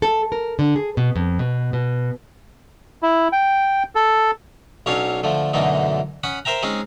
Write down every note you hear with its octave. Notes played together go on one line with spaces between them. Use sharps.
A4
A#4
D3
G#4
B2
F2
B2
B2
E4
G5
A4
B1 F#3 C#4 D4 C#5 F5
D3 F3 A3
F#2 B2 D3 E3 A3 D#4
C#4 F#5 B5 D#6
A#4 C5 E5 G5 A#5
G#3 C4 C#4 D#4 G#4